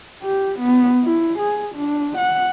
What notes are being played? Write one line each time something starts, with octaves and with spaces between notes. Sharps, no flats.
G4
B3
E4
G#4
D4
F#5